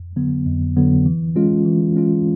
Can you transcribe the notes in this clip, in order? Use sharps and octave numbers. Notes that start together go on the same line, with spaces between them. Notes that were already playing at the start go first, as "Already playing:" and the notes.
Already playing: F2
D3 F#3 B3
F2
D3 F#3 B3
E3
G#3 C#4 F4
E3
G#3 C#4 F4